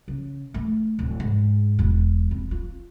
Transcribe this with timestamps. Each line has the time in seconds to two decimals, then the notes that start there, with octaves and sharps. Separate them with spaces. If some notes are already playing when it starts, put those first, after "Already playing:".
0.08 C#3
0.54 A3
0.99 D1
1.20 G#2
1.79 E1
2.31 C4
2.51 F4